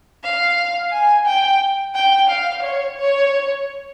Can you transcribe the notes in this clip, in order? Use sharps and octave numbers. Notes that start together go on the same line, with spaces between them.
F5
G#5
G5
G5
F5
C#5
C#5